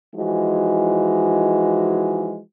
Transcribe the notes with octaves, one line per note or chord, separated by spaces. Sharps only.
E3 F3 G#3 D#4 F#4